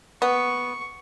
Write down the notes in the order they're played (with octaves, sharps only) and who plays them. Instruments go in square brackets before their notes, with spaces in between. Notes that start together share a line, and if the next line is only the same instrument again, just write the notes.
[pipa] B3 [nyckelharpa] C#6